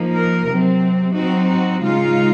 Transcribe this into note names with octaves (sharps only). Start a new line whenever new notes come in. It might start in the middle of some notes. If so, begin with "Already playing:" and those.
Already playing: F3 A#3 D#4
A#4
C3 F#3 C4
F#3 C4 D#4 F#4
F#4
C#3 G#3 D#4 F4